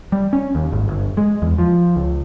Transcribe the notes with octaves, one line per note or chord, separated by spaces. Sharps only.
G3
C#4
D#2
G#1
G1
G#3
E2
F3
C#2